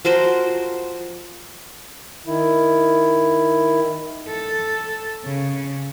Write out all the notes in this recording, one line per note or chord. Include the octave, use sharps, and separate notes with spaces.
F3 F#4 A#4 C5
D#3 E4
A4
C#3